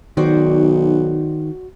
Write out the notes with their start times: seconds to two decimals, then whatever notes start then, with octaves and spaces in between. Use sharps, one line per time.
0.17 B1 D#3 F#4 C5 D5